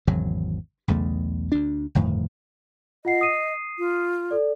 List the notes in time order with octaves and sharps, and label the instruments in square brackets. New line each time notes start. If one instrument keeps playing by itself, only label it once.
[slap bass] G#1 E2 C#3 F#3
B1 E2 C#3 A3
D2 D4
G1 F2 A2 D#3
[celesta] F4 F#5 C7 [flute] D#5
[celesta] D#6 C7 D#7
[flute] F4
[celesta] A4 D5